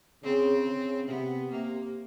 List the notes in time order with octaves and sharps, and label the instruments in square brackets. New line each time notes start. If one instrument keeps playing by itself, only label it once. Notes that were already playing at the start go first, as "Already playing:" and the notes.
[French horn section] C#3 [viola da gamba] C4
[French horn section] C#3
[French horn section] C3 [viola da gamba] B3
[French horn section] C3 [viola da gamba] A#3